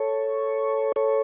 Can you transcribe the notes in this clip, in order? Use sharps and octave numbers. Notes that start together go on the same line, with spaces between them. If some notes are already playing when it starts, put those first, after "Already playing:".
Already playing: A4 C#5
A4 C#5